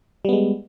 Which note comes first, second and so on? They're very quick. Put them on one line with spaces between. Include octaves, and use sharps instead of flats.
G3 B3 G#3